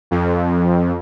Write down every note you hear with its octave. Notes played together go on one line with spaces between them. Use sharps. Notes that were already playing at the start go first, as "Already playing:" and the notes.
F2